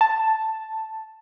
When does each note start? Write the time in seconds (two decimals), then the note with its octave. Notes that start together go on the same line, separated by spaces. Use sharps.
0.01 A5